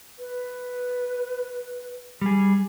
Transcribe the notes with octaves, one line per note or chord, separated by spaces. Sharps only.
B4
G3 G#4